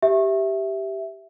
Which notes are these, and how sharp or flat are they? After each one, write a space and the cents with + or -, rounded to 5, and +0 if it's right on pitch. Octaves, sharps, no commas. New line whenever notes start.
G4 -5 E5 +0